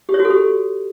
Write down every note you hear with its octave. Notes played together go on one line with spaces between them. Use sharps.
G4
C#5
F#4
A4
G4